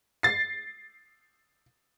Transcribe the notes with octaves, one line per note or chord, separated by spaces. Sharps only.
A6 C7